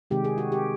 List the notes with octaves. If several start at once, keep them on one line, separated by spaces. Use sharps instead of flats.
C3 D#3 G#3 G4
G#4
F#4
G4